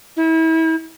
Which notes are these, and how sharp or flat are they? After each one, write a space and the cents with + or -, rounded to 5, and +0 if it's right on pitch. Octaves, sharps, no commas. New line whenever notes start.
E4 -30